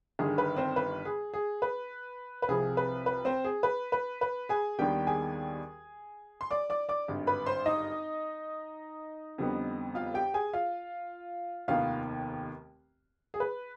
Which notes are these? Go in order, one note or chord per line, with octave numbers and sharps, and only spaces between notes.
G1 G2 D#3 G#4
B4
C4 C5
B4
G#4
G#4
B4
B4
C2 C3 F3 G#4
B4
B4
C4 C5
G#4
B4
B4
B4
G#4 G#5
D#2 D#3 G3 B3 D4 G4 G5
G#4 G#5
C6
D5 D6
D5 D6
D5 D6
G#1 G2 D3
B4 B5
C5 C6
D#4 D#5
F2 D3 G3 B3
F4 F5
G4 G5
G#4 G#5
F4 F5
F1 D#2 D#3 B3 F4 F5
G#4
B4